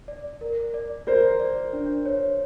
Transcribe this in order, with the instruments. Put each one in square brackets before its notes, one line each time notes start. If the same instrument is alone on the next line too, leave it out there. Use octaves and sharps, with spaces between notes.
[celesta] D5
A#4
D5
[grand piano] A#4 C5 [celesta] D5
[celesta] D5
D4
C#5